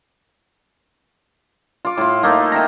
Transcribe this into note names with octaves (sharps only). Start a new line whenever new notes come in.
F4 D6
A2 F4
A3 A#3 D#4 F4
E5 G5 A#5